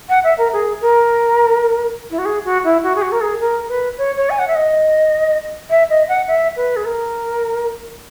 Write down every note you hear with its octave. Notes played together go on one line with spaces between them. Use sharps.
F#5
E5
A#4
G#4
A#4
E4
F#4
G#4
F#4
E4
F#4
G#4
F#4
A#4
G#4
A#4
B4
C#5
C#5
G#5
F#5
E5
D#5
E5
D#5
F#5
E5
B4
G#4
A#4